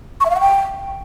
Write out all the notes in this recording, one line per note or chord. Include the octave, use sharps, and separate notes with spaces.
C#6
E5
F5
F#5
G5